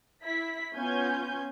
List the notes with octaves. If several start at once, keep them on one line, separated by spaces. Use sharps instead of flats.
E4 B6
B3 C#4 F4 G#5 G6